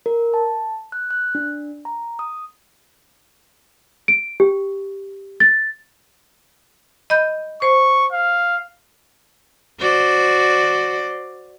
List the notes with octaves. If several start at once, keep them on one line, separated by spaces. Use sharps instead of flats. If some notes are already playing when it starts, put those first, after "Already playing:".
A#4
A5
F#6
F#6
D4
A#5
D#6
D7
G4
A6
D#5 B5 G6
C5 C#6
F5
F#4 C5 D5